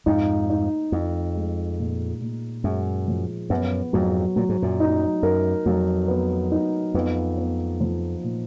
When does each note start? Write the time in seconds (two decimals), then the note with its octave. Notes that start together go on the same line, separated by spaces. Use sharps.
0.06 F2 G#2 D#4
0.50 D#4
0.92 F2 D#4
1.36 G#3
1.79 A#2
2.21 A#2
2.64 F#2 G#3
3.08 F3
3.50 F#2 B3
3.93 F2 G#2 F#3
4.36 A#2 F#3
4.49 G#2
4.62 F#2 A#2
4.80 D#4
5.23 F#2 A#4
5.66 F2 F#3
6.08 B3
6.52 D#4
6.94 F2 B3
7.38 B3
7.81 F3
8.23 A#2